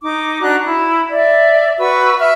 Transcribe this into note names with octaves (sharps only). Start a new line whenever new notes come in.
D#4 D6
D4 F#4 A#5 F#6
E4
D5 E5
F#4 B4 C#6 E6
E5 F6